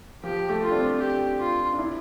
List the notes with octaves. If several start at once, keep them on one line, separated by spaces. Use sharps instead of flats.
F3 G4
A3
F4
D4
C4
G4
F4
D4
E4